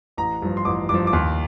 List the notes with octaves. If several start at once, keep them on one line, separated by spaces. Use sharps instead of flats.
A1 A#5
G2 F3
C6
A1 D6
G2 F3 D6
D6
D#2 C6